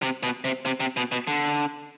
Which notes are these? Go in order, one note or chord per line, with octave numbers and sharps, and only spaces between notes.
C3
B2
C3
C3
C3
B2
B2
D3